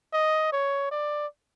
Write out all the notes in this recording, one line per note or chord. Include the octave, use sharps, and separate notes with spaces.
D#5
C#5
D5